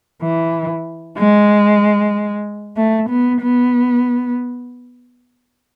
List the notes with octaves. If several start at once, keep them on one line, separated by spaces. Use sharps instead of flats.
E3
G#3
A3
B3
B3